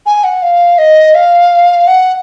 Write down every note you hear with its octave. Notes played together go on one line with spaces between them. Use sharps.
G#5
F#5
F5
D#5
F5
F#5